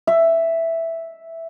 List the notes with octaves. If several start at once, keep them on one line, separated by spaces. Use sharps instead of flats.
E5